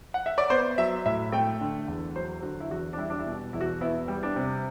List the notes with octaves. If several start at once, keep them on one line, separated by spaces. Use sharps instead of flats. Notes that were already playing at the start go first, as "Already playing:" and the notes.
F#5
E5
D5
B3 C5
F#3 E5
A2 E5
A3 G5
D3
E2
F#3 C5
D3 F#4
E4
E2 F#4
D4
G3 E4
D4
E4
B2
E2 E4
F#4
B3 E4
G3
D4
C3